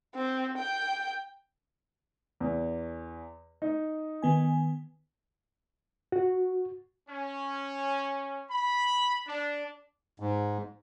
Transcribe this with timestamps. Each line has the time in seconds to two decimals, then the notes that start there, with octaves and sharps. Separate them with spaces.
0.15 C4
0.57 G5
2.40 E2
3.62 D#4
4.22 D#3 B3 G#5
6.12 F#4
7.09 C#4
8.50 B5
9.27 D4
10.20 G#2